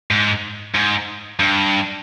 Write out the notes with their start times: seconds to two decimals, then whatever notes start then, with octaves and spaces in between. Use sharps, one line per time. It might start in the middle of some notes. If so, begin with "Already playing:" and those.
0.11 G#2
0.75 G#2
1.39 G2